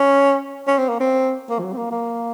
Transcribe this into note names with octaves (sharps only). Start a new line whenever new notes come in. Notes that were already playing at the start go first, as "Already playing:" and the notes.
Already playing: C#4
C#4
C4
A#3
C4
A#3
F3
F#3
C4
A#3
A#3